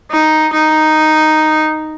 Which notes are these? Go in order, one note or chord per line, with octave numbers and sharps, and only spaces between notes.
D#4
D#4